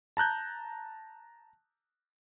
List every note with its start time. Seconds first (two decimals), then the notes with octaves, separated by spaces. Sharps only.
0.17 A5 A#5 F#6 G6